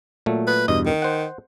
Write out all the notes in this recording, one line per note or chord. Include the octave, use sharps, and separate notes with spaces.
A#2 F#3 A3
B4
E2 G2 B2 D#5
D#3
C5 F#5